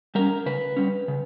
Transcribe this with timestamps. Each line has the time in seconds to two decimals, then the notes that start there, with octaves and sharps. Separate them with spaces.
0.15 G3 C#4 A#4
0.46 C#3 B4
0.77 G3 C#4
1.08 C#3